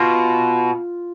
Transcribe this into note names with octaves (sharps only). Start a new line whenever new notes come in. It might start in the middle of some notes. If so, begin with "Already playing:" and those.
Already playing: B2 F4